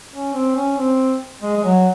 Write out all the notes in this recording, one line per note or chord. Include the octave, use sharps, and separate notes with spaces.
C#4
C4
C#4
C4
G#3
G#3
F#3